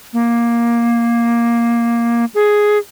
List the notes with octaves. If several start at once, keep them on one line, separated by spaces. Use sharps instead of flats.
A#3
G#4